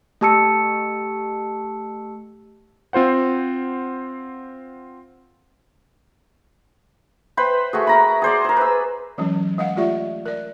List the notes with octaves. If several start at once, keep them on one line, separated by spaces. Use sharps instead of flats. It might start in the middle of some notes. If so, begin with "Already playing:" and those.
A3 G4 A5 E6 C#7
C4 F4 C5 F#5
B4 C5 G5 B5
A3 F#4 G#4
A#4 A#5 B5
G#4 C5 D5
A#4 C5
B4 E6
E3 F#3 G#3 C#4
G#3 D#5 F5 F#5
A3 F4 G4 D5 E5 C#6
A#4 D5